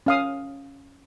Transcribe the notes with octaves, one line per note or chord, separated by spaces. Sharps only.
C#4 F5 D#6